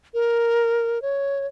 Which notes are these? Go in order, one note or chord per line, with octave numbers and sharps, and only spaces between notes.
A#4
C#5